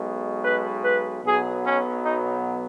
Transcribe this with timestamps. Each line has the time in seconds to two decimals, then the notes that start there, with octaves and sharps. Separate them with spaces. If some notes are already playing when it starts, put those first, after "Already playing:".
Already playing: B1 B2 G#3
0.43 B4
0.83 B4
1.23 B1 B2 F#3 B3 G#4
1.64 C#4
2.03 D#4